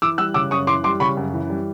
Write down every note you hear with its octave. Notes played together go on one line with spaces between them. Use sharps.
E3 D6 E6
G3 E6 F#6
C#3 D6 E6
F#2 C#6 D#6
E3 C6 D6
G3 C6 D6
C#3 B5 C#6
F#2
E3
G3